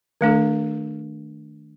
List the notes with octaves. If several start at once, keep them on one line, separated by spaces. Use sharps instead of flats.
D#3 A3 D4 A4